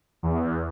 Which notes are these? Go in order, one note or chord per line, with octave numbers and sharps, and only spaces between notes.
E2